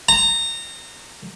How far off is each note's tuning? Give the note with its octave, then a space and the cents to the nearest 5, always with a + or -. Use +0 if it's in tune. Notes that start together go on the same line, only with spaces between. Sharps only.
A#5 -25